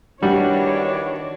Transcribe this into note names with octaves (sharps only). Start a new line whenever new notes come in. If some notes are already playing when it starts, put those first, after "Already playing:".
D#3 E3 G3 D4 F#4 C#5